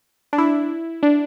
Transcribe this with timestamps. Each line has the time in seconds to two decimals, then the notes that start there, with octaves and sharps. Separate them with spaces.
0.33 D4
0.38 E4
1.03 D4